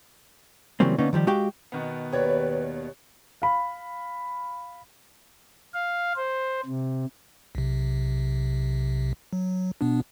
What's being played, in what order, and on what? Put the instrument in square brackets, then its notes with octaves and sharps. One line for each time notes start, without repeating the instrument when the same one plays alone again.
[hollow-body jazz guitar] C#3 E3 F#3 G3 A#3 C4
D3 A#3 B3 C#4 D#4
D#3 F3 G3 G4
G#3 F#4 G4 F5 G5
[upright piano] B2 D#3 B3
[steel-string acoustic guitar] D#2 C#5 D5 [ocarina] B4
[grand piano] F5 B5
[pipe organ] F5
C5
C3
[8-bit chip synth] B1 C3
F#3
B2 B3 D4